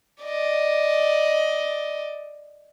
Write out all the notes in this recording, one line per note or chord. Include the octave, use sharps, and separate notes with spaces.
D5 D#5